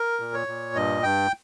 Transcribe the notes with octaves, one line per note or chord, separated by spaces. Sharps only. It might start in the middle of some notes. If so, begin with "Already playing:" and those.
Already playing: A#4
A#2
C#5
A#2
G2 D#5
G2 G5